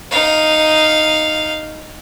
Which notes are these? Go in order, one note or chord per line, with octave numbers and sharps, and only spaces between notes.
D#4 F5